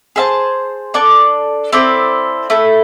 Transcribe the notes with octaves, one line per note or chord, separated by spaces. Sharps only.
G#4 C5 E5 A5
D4 A4 D5
C4 E4 A4 D5
A3 E4 A4